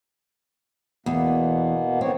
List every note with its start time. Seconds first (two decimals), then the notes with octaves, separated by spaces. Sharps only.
1.06 E2 B2 A#3 B3
2.01 D#3 B3 C4 C#5